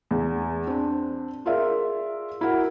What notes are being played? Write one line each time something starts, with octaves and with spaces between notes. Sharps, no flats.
E2
C4 D4
F4 G#4 A#4 D5 E5
E4 F#4 A#4 F#5